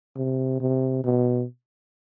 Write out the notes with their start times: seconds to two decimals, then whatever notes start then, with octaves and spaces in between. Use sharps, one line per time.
0.16 C3
0.61 C3
1.04 B2